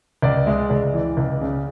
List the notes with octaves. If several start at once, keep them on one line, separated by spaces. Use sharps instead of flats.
C#2 D5
G#3 E5
C#2 D5
E3
C#2
C#3